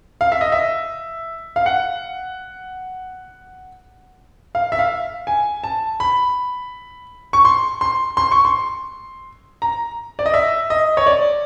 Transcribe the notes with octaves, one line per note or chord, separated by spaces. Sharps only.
F5
E5
D#5
E5
F5
F#5
F5
E5
F5
G#5
A5
B5
C#6
C6
C6
C6
C#6
C6
A#5
D5
D#5
E5
D#5
C#5
D5